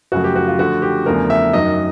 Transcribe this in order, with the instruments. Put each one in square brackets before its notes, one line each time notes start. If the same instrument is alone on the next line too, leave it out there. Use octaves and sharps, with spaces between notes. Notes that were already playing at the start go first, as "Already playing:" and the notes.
[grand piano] F#2 C#3 F3 A3 F#4
G4
F#4
F4
D3 F3 A3 F#4
G4
E2 C#3 F3 A3 D4 A#4
E5
F#2 D#3 F#3 D#5